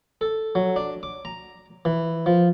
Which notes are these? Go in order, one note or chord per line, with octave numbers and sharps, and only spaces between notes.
A4
F#3
D4
D6
A#5
E3
F3